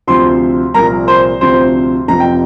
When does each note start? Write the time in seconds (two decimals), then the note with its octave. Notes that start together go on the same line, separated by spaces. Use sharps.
0.07 D2 C3 F3 C5 C6
0.74 C2 A#2 F3 A#4 A#5
1.08 C5 C6
1.41 D2 C3 F3 C5 C6
2.08 F1 F2 C3 F3 A#5
2.20 G5